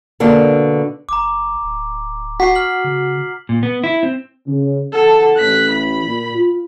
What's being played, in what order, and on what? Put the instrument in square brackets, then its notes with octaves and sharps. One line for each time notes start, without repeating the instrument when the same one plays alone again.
[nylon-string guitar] B2 D3 A#3 D4
[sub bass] F#1 [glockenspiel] A#5 D6
[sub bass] D1
[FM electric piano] F#4 [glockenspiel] B6 C7
[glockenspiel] F6 F#7
[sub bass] C#3
[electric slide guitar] A#2
B3
E4
C4
[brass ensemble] C#3
[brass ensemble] E2 F#5 A5 [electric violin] A4
[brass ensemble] A1 [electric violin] F#6 B6
[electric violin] B5
[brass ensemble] A#2
F4